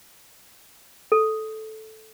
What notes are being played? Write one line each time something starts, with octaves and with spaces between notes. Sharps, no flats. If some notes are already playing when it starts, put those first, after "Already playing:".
A4